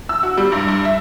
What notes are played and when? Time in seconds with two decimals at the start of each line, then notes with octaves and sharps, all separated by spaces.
0.09 E6
0.23 F#4
0.37 G3
0.52 G2
0.68 G2
0.85 E5